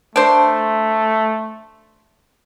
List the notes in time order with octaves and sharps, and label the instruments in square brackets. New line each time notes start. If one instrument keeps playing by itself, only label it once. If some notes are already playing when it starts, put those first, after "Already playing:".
[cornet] A3 [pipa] D4 C5